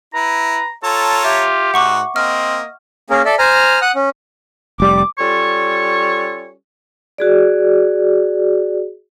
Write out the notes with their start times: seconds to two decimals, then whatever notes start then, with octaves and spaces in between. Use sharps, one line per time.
0.14 E4 B4 A#5
0.84 F4 A4 C#5 A5 A#5
1.25 G4 E5
1.74 G#2 F#4 F#5 C#6 D6
2.16 A#3 C4 D#5 F6
3.10 A#3 C#4 G#4 A#4
3.25 A4 D5 E5
3.39 C5 G#5 A#5 F6
3.82 F#5 D#6 F#6
3.95 C#4
4.80 F1 G3 D6
5.19 G3 C#4 F4 A4 C#5 C#6
7.18 F#4 G#4 D5